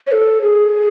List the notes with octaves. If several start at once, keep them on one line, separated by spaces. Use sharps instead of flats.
C#5
A4
G#4